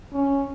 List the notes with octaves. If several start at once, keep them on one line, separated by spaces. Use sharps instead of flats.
C#4